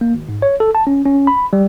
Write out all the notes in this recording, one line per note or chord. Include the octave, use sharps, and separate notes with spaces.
A#3
G#1
G#2
C#5
A4
A5
C#4
C#4
B5
G3